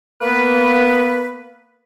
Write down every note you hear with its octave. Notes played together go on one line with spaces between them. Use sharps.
A#3 B3 B4